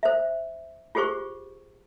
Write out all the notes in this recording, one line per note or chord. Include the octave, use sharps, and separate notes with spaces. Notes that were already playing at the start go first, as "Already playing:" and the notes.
C5 E5
F4 G4 G#4 C5 C#6